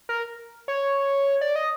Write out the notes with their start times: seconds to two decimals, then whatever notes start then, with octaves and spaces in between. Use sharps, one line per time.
0.09 A#4
0.68 C#5
1.41 D5
1.56 D#5